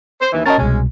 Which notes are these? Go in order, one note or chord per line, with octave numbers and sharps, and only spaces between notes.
C5
D#2 E3
C#4 F#4 A#4 D#5 A5 A6
C2 B2 G#3 C#4